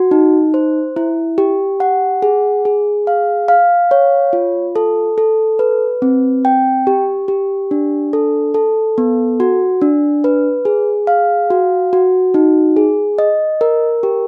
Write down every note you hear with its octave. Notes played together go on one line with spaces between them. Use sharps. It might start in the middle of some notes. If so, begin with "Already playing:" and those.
Already playing: F#4
D#4
C5
E4
G4
F#5
G#4
G#4
F5
F5
C#5
F4
A4
A4
B4
C4
G5
G4
G4
D4
A4
A4
B3
F#4
D4
B4
G#4
F5
F#4
F#4
D#4
G#4
D#5
A#4
G4